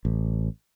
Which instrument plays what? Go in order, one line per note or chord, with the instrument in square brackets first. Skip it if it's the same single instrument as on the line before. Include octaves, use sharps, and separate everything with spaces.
[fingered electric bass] A1